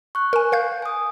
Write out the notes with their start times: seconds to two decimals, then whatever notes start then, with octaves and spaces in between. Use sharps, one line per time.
0.15 C#6 F#6
0.33 A#4 G#5
0.52 A#4 F5 G6
0.82 G#5 D#6